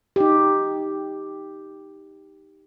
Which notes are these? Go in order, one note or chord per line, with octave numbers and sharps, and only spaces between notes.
D#4 G4